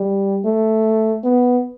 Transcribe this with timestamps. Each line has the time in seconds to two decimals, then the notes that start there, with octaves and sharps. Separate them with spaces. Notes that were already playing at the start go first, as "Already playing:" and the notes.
Already playing: G3
0.45 A3
1.24 B3